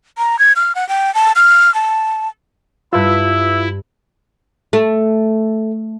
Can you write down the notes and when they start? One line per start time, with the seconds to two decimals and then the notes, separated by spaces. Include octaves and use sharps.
0.18 A#5
0.39 G#6
0.56 F6
0.75 F#5
0.89 G5
1.14 A5
1.36 F6
1.74 A5
2.93 G2 E4 F4 B4 E5 E6
4.73 A3